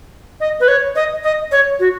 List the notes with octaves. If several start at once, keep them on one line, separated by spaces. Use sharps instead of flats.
D#5
B4
C#5
D#5
D#5
C#5
F#4